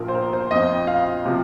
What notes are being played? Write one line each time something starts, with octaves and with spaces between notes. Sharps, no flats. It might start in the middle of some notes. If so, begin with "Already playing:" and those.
Already playing: A#1 A#2 F3 A#4
C5
A#4
C5
F2 F3 C4 D#5
F5
C3 F3